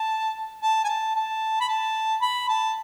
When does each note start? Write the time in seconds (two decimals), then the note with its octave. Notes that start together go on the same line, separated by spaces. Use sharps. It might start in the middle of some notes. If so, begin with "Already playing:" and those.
Already playing: A5
0.62 A5
0.84 G#5
0.88 A5
1.15 A5
1.61 B5
1.69 A5
2.22 B5
2.49 A5